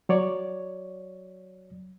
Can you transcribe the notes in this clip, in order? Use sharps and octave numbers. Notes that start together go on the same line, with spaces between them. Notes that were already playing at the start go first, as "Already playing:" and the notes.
F#3 C#5 D5